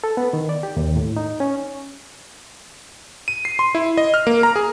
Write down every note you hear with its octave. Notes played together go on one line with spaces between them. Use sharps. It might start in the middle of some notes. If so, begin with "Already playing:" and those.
A4
B3
D#3
D5
G4
D#2
A2
D#4
C#4
D#7
C7
C6
E4
D#5
F6
A#3
A#5
G#4